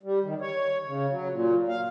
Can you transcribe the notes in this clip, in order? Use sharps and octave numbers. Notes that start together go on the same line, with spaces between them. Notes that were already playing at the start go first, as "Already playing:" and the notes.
G3
D#3
C#5
C#3
F#3
A#2
F5